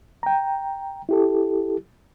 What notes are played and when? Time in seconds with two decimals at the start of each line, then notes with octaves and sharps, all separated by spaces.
0.23 G5 A#5
1.09 E4 G4 A4